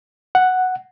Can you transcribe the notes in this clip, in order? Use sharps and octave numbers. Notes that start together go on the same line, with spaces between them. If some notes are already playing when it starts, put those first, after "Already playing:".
F#5